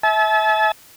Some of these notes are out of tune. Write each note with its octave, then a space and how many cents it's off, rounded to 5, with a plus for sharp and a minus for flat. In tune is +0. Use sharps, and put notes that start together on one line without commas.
E5 -25 A5 -40